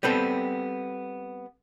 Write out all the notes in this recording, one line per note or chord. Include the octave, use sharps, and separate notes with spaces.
G3 B3 C4 A4